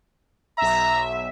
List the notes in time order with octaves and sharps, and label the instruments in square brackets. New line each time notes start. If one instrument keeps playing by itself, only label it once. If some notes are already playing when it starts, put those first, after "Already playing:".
[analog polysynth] B1 E5 [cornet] A#5